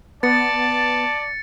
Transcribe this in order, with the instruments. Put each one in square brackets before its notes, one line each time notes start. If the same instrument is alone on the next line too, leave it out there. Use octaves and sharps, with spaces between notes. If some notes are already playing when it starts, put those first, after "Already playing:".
[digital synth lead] B3 [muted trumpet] D5 [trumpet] A5 [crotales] A6 C#7